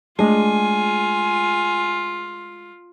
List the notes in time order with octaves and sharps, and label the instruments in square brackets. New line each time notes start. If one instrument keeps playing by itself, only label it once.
[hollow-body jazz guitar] G#3 D4 G#4 [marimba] A3 [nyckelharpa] F4 [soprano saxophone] G#5